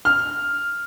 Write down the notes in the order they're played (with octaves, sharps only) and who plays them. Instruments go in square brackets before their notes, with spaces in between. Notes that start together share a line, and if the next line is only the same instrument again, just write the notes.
[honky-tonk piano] F6